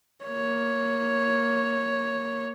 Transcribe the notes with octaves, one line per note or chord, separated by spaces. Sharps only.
A#3 C#5